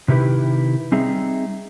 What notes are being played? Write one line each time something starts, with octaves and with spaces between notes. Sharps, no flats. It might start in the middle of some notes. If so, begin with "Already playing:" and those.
C3 D#3 E4 G4 B4
G3 C4 D#4 G#4 E5